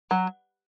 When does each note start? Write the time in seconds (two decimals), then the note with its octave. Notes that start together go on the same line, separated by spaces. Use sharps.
0.11 F#3